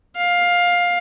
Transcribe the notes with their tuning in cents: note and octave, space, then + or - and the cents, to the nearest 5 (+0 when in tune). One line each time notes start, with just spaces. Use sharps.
F5 +15